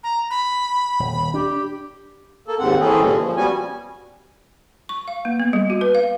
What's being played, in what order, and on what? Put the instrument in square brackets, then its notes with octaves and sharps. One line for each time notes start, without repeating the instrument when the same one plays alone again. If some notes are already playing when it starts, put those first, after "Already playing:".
[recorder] A#5
B5
[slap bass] D#1
[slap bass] D4 [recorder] G4
[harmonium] A#3 A4
D#2 G#2 C4 F#5
E3 C4 C#4 G#4 A4
G2 A#2 D3 G#3 C#4
F3
G3 B3 C#4 F#4 G#5
[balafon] C#6
F5
A#3
B3
G3
F#4
B4
F5